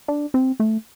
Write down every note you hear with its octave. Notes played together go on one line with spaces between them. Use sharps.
D4
C4
A3